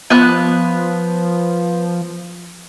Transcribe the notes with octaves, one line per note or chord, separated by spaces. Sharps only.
F3 B3 F#6